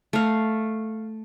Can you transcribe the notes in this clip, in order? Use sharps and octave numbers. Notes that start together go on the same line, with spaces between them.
A3 F5